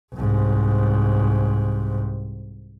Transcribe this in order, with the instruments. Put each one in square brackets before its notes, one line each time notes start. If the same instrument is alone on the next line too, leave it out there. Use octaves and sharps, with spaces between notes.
[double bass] C2 G#2